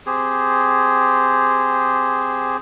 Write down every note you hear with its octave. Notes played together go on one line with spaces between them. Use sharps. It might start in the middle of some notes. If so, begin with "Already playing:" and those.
C4 G4 G#4